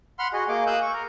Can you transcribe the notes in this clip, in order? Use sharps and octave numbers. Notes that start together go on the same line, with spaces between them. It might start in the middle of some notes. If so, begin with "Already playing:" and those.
F#5 B5 C6 F6
F#4 G#4 D#5
A#3 G#4 D#5 D6
F5 D#6 E6 F#6 G6
C#6
A#4